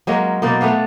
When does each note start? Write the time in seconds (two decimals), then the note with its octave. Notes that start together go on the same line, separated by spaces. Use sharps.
0.07 F#3 G#3 A#3 C#4
0.42 B2 A#3 D#4 D5
0.61 A3 B3 D4 F5